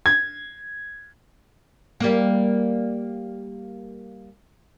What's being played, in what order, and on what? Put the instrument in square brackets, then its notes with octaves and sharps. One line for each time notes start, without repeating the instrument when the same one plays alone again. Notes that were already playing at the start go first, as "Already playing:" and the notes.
[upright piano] G#6
[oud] G3 A#3